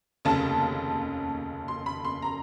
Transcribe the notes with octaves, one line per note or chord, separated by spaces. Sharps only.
F1 D#2 C#3 A5
C6
B5
C6
A#5